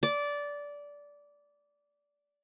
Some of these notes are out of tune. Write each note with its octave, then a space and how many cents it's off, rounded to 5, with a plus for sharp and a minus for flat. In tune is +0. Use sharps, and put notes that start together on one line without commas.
D5 -15